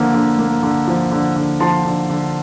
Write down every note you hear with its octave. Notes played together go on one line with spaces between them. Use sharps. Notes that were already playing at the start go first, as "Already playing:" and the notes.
Already playing: D3 F3 A#3
D3
A#3
D3
F3
D3
D3
F3 A5 C6
D3
D3